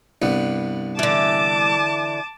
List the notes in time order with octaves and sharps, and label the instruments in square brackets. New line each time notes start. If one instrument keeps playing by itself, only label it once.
[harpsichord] C2 G2 B3
[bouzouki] D3 E3 [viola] A5 D6